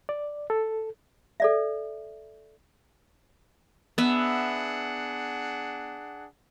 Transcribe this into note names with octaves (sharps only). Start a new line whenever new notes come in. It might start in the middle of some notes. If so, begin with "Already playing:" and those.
D5
A4
A4 D5 E5
B3 D4 G#4 E5 F#5